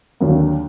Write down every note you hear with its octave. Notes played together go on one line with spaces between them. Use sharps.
D#2 D3 F#3 A#3